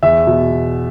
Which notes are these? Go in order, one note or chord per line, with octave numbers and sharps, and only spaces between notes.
E2 E5
B2